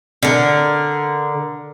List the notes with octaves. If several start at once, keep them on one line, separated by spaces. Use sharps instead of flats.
D3 A#4